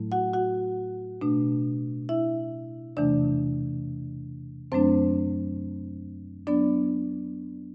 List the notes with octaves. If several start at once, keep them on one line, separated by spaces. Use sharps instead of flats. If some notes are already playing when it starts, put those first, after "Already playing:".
Already playing: A2 F#3 A3 E4
F#4 F#5
F#4 F#5
B2 A3 D4
E4 E5
E2 C3 E3 A3 D4 D5
F#2 F#3 A3 C4 D4 C5
F#3 B3 D4 D5